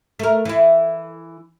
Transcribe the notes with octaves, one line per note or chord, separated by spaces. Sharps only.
A3 A#4
E3 E4